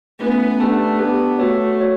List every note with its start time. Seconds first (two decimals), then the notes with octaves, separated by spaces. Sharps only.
0.20 A3 B3 C#4 E4 B4
0.59 A3 D4 G4 B4 F#5 A5
0.98 B3 D4 G4 B4 F#5 A5
1.39 A3 F#4 C#5 F#5
1.78 F#4 C#5